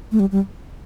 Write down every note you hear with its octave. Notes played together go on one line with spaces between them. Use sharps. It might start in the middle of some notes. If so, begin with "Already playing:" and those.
A3
G3
G3